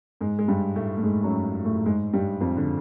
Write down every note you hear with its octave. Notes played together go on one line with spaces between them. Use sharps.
G#2 G#3
G#3
G2 G3
A2 A3
A3
G#2 G#3
F#2 F#3
A2 A3
G#2 G#3
G2 G3
F2 F3
D3